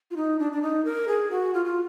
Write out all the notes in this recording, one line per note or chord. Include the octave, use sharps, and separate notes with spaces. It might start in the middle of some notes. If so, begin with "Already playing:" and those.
F4
D#4
D4
D4
D#4
A#4
G#4
F#4
F4
F4